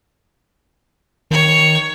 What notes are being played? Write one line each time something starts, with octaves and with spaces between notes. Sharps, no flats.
D#3 C#5